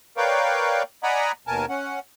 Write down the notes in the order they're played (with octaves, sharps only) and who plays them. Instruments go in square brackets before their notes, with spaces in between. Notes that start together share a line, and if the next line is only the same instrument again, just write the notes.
[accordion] A#4 B4 C#5 D5 F5 G5
D5 D#5 F#5 G#5 A#5 B5
D#2 B2 A#4 G#5 A5
C#4 F#5